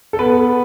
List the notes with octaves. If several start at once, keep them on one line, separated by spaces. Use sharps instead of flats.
A4
B3 B4